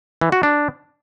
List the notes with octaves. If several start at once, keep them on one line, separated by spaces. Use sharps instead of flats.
E3
F#4
D4